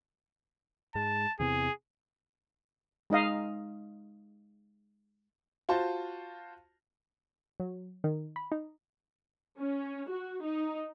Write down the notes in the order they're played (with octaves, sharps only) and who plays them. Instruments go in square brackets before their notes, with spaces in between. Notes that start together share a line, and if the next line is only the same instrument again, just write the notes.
[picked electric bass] G#2 G#3 [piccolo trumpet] A5
[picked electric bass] E2 C3 E3 [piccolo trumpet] G#4
[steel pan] G#3 D#4 D#5 F5
[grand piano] F4 F#4 C5 A5
[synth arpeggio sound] F#3
D#3
B5
D#4
[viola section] C#4
F#4
D#4